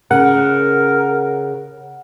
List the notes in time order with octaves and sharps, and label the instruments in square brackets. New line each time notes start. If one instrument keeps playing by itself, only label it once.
[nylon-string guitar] C#3 [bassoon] A#4 [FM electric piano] F#5